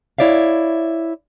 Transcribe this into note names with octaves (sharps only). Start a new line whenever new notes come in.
E4 C#5 D5 E5 F5